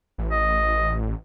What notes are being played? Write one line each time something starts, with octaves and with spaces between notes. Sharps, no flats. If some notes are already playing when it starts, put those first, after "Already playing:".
A1
D#5